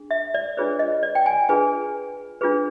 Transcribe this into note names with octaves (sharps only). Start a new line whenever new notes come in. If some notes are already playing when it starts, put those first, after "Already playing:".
Already playing: D4 G#4
E5
D5
D4 F4 G#4 B4 C#5
D#5
D5
G5
G#5
D4 F4 G#4 B4 G#5
D4 F4 G#4 B4